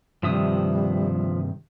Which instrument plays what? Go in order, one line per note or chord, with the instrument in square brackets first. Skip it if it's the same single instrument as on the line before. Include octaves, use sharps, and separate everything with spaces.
[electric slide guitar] G2 C3 D#3 [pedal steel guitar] F3 E5 D#6 [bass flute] G3